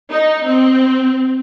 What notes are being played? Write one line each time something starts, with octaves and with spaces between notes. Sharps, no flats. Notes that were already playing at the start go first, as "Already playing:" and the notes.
D#4
C4